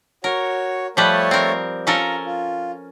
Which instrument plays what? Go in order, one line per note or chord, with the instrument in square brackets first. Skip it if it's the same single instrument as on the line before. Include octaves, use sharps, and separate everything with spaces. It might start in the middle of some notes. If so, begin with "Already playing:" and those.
[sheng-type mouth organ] F#4 C#5 [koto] A#4
[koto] F3 G3 B4 [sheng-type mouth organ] A3 C#5 A5
[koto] C4 A#4
[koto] C#4 A4 A#4 [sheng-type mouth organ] F4 A#5
[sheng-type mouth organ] F4